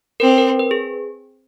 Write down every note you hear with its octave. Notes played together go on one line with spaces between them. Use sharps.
C4 A#4
B4
A#4
B4
G#4